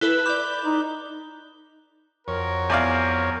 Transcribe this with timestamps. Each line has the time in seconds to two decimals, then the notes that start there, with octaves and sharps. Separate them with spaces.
0.01 E4 A4 B4 F#6 G7
0.26 D5 B5 D6 G6 F7
0.65 D#4
2.28 F2 F#4 A#4 C#5
2.70 E2 D5 F5